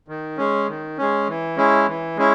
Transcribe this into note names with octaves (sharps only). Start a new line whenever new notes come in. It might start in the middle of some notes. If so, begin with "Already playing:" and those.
D#3
G#3 C#4
D#3
G#3 C#4
E3
G#3 C#4 E4
E3
G#3 C#4 E4